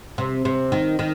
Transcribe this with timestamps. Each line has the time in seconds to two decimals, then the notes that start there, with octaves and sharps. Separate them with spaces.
0.18 C3
0.45 C3
0.72 D#3
0.99 D#3